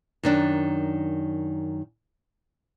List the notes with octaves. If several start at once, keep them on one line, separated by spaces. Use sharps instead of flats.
F#2 D#3 D4